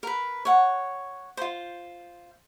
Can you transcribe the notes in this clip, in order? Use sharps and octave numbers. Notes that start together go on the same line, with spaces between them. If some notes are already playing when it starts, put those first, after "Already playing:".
A#4 B4
C#5 F#5
F4 C5